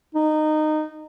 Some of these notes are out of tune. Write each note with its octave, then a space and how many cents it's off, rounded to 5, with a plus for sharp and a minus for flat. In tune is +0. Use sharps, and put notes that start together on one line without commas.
D#4 -20